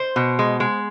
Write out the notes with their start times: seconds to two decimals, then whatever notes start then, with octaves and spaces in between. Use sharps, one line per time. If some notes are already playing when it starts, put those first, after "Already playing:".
Already playing: C5
0.16 B2
0.39 G#3
0.60 G#3